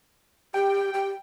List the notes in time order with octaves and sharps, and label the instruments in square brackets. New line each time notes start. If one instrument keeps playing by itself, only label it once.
[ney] G4 [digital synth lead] G5
[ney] G4